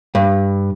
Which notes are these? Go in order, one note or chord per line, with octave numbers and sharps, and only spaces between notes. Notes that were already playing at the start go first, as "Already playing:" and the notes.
G2